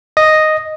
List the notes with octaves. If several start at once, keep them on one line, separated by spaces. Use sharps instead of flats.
D#5